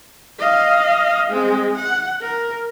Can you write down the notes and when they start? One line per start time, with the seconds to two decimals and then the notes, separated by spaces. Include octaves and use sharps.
0.39 D#5 F5
1.30 G#3 C4
1.76 F#5
2.21 A#4